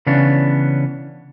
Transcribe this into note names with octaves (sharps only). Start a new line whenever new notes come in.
C#3 E3 B3 C#4 D4